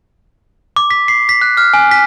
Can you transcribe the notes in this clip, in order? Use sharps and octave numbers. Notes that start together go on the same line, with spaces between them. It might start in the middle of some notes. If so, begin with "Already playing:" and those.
D6
B6
C7
B6
F#6
F6
G#5
B6